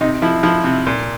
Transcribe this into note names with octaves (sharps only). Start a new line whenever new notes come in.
C3 D#4
F3 E4
F3 E4
C3
A#2